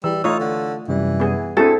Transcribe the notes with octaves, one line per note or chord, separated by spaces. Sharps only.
E3 G3 E6
A3 D#4 F4 C#5
D3
F#2 C3 E3 G3
B3 G#4
C4 D4 E4 F#4 G#4 A4